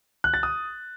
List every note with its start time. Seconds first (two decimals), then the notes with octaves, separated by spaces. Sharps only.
0.24 F#6
0.34 A6
0.43 D#6